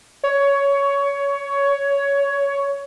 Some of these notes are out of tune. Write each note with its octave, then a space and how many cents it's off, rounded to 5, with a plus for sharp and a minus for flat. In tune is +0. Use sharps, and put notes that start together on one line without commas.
C#5 +15